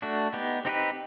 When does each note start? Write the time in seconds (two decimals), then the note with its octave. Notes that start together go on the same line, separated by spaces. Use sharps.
0.02 A3 D4 F#4
0.33 B3 D#4 G4
0.65 C4 D#4 G4 B4